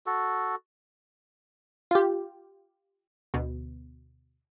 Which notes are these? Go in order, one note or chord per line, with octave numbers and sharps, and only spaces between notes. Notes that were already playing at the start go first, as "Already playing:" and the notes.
F#4 A4
F4 G4
D2 B2